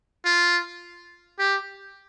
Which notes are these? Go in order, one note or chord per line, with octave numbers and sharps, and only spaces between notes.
F4
G4